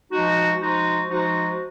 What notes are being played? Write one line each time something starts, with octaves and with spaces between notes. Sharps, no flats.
F3 G#3 D#4 F#4
F3 G#3 D#4 F#4
F3 G#3 D#4 F#4